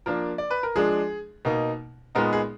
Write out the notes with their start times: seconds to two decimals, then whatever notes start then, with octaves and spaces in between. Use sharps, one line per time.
0.06 F3 A#3 D4 A#4
0.38 D5
0.50 B4
0.63 A#4
0.75 F3 G#3 D4 G#4
1.45 B2 A#3 D#4
2.15 A#2 G#3 B3 D#4 A#4
2.33 G#4